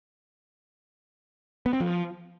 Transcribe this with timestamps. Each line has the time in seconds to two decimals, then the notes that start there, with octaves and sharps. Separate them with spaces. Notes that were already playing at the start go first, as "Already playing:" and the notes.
1.66 B3
1.73 C4
1.80 F3